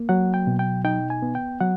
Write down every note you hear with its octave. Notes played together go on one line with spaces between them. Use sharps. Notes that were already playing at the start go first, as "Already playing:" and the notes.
Already playing: A#3
F#3 F#5
G5
B2
G5
D#4 G5
G#5
B3
G5
F#3 F#5